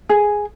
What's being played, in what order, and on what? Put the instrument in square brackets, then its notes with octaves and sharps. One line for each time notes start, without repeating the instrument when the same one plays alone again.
[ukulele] G#4